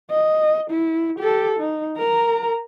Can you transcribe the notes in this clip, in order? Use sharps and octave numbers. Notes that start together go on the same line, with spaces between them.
D#5
E4
G4 A4
D#4
A#4 A#5